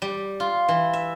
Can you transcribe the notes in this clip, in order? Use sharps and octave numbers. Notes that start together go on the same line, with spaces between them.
G3
F4
E3
E5